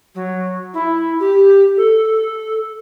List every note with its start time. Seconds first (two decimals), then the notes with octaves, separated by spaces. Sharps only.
0.15 F#3
0.73 E4
1.19 G4
1.77 A4